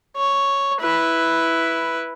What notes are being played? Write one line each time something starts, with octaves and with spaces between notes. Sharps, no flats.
C#5
E4 B4